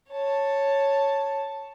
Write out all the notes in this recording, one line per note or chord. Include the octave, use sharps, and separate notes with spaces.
C#5 A5